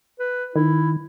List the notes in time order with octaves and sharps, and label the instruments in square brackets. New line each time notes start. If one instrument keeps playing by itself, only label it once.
[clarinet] B4
[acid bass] D#3 [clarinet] E4